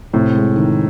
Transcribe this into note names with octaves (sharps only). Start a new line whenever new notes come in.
A2 C3
G#3
D#3